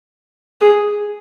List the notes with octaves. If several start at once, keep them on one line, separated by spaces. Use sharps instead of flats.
G#4